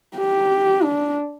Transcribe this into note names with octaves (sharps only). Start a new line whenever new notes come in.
G4
D4